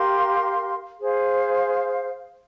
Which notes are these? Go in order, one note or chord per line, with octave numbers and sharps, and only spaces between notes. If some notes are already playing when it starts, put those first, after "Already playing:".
Already playing: G4 A#4 F5 C6
G#4 C5 F5